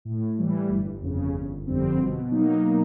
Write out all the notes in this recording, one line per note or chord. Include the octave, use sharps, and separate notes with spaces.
A2
E3 G3
G1
F2 C#3
G1
F2 D3 G3 C4
B2
F#3 A#3 D#4